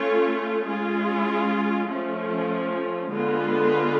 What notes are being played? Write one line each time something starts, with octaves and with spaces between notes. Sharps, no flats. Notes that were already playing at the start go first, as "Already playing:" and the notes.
Already playing: A3 C#4 F4 A4 C#5
G#3 C#4 F4 G#4
F3 A3 C#4
D3 G#3 B3 F4 B4